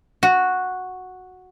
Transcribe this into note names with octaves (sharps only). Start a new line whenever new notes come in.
F#4